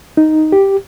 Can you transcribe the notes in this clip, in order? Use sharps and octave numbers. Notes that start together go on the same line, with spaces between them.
D#4
G4